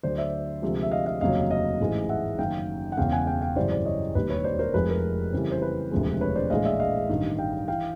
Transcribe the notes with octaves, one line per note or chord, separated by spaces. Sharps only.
D2 D3 F#3 C5 D5
D5 E5
D2 C3 F3 G#3
E5
D#5 F5
D#5 F5
F1 D#2 C#3 F#3 D#5 F5
D#5 F5
A1 G#2 E3 G#3
E5 F#5
F#1 F#2 D#3 F5 G5
F#5
E1 E2 C#3 F5 G5
F#5 G#5
F5 G5
F5 G5
G#1 F#2 C#3 E3 G3 C5 D5
C5 D5
C#5 D#5
E1 D#2 D#3 G3 B4
B4 C#5
C5 D5
C#5
A#4 C5
F1 F2 C3 F3 G#3 B4
A#4
F2 C#3 E3 G3
C5
B4
E1 D2 C3 F3 G#3
B4 C#5
C5 D5
A#1 A2 E3 G#3 D#5 F5
D5 E5
D#5 F5
A1 G2 D#3
F5 G5
E3 F5 G5